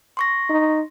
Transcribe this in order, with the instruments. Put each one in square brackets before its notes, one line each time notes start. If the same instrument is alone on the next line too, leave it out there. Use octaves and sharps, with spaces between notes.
[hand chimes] C6 C#6 A#6
[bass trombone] D#4